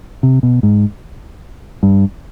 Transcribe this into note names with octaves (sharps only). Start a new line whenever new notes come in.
C3
B2
G#2
G2